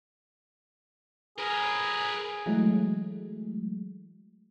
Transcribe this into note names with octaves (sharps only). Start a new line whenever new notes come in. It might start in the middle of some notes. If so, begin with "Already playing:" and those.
G#4 A#4 B4
E3 F#3 G#3 A3